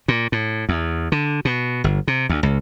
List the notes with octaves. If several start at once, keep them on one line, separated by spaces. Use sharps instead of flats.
A#2
A2
E2
D3
B2
G1
C3
D2
C#2